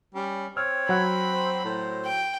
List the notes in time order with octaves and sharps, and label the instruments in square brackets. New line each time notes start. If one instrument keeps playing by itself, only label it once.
[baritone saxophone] G3 [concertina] C#4
[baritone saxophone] C4 [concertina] C#5 [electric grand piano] E6 F6
[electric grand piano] F#3 F#5 F#6 [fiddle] B5
[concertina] C5
[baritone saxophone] A2 [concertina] C5
[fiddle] G5